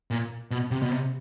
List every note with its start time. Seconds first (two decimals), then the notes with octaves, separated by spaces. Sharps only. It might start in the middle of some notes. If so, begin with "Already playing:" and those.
0.11 A#2
0.51 B2
0.71 C3
0.82 B2
0.91 C3